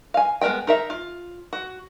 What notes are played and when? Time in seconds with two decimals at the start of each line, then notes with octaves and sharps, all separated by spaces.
0.14 F5 G#5
0.41 G#3 B3 A#4 D#5 G5
0.67 D#4 A#4 E5
0.90 F4
1.53 F#4